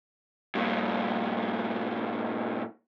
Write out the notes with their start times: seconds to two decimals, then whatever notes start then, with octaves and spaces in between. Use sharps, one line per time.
0.55 G2 A#2